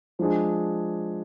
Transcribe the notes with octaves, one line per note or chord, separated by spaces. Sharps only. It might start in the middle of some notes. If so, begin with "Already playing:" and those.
F3 G#3 D4 G#4